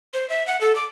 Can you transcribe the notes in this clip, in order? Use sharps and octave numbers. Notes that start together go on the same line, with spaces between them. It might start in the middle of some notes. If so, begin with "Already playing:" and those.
C5
E5
F#5
A4
D6